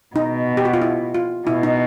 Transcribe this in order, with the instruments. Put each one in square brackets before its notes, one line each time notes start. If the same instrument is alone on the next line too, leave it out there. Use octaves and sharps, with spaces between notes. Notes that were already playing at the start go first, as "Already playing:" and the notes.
[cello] B2 [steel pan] D#4
[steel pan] G4
F#4
F4
E4
F4
[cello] B2 [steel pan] E4
[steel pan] D#4